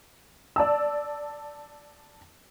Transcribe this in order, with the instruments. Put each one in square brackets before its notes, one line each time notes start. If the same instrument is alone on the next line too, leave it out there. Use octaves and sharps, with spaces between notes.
[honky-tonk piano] D5 A5 E6